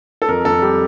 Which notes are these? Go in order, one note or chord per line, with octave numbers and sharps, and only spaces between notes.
A4
F2 A#4
F2 A4
G3 G4